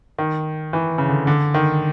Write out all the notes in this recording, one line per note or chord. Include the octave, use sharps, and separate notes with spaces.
D#3
E3
C#3
D3
D3
D#3